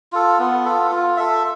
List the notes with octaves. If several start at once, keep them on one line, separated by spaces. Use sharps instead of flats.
F4 A4
B3
F4 A4
F4
A4 E5